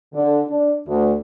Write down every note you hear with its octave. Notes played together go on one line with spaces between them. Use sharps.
D3
D4
D2